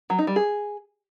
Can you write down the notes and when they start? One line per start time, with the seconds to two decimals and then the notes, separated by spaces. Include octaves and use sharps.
0.10 F#3
0.19 D#4
0.27 G3
0.36 G#4